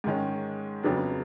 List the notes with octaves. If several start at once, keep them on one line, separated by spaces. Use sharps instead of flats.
G#2 D#3 G#3 C#4
F2 C#3 F#3 B3 D4